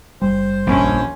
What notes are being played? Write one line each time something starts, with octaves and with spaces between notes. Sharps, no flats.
F#1 C2 G3 C5
A#1 D#2 C#4